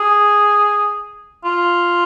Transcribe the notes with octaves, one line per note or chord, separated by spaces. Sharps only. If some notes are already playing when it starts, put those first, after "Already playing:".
Already playing: G#4
F4